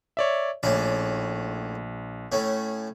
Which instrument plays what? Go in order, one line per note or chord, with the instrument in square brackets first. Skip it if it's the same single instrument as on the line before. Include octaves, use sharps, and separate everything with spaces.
[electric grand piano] C#5 D5 E5
[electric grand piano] A#1 [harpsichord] A2 C#4 D5
[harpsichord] A2 A3 C#4